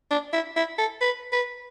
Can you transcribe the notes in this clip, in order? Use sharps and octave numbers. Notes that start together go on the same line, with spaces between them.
D4
E4
E4
A4
B4
B4